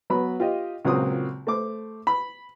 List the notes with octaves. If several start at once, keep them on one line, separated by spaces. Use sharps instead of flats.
F#3 B3 B5
F4 G4 D#5
C#2 A#2 F#3 A#3 C4 D#6
A3 C5 D6
B5